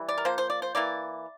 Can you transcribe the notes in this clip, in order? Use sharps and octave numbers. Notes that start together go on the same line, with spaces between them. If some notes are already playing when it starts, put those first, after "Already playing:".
Already playing: E3 G3
D5
A#4
F3 A#3 C5
C5
D5
C5
E3 A#3 D5